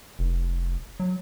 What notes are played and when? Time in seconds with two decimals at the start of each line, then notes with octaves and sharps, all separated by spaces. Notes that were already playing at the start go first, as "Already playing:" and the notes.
0.19 F1
1.00 F#3